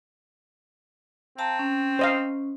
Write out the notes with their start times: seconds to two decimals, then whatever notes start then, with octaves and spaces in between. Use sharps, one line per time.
1.38 C4 F5 A5 A#5
1.59 C#4
1.99 C5 D#5 F5